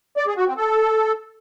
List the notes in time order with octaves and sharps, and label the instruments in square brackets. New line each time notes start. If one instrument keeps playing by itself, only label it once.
[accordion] D5
G#4
F#4
C4
A4